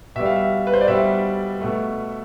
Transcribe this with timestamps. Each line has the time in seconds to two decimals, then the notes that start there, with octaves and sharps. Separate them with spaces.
0.16 B2 G3 E5
0.26 F5
0.36 E5
0.67 B4
0.74 C5
0.81 D5
0.88 B2 G3 E5
1.61 B2 A3